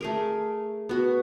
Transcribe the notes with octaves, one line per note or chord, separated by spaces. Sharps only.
A3 G#4 A#4
B3 F#4